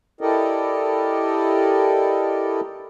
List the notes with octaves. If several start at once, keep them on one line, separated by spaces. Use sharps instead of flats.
E4 G4 A4 A#4 D5 D#5